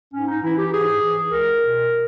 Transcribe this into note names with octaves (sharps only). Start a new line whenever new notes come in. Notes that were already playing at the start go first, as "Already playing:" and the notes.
G#2 C#4
D#4
E3 E4
G4
G#2 G#4
E3
C#2 A#4
B2